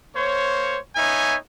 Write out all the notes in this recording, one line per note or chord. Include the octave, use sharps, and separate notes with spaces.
A#3 C5 C#5
B3 D#4 C#5 E5 G#5